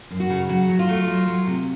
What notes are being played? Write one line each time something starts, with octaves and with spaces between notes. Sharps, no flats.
F#2
F#4
C#3
F#3 F#4
F#3
F4
A3
F#3
F#3
C3